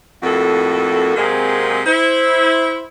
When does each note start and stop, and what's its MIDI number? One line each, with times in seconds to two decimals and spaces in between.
0.23 1.13 41
0.23 1.13 45
0.23 1.13 58
0.23 1.13 66
0.23 1.13 69
1.16 1.79 48
1.16 1.79 54
1.16 1.79 56
1.16 1.79 58
1.16 1.79 60
1.16 1.79 68
1.86 2.85 64
1.86 2.85 72